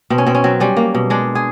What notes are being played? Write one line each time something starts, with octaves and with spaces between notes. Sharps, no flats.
B2 C4
C#4
B2 C4
C#4
F#3 C4
G3 C#4
A#3
B2
G#3 D4
G#4